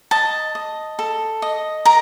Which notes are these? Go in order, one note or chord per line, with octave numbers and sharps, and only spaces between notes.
D#5 A5
D#5
A4
D#5
A#4 A#5